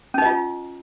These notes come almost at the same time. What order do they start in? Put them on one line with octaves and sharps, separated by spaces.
C#4 D#4 D#5 F4